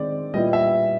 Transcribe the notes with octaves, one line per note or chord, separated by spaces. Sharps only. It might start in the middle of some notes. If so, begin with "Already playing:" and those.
Already playing: D#3 G#3 C4 D#4 D5
A#2 G3 B3 E4 D#5
E5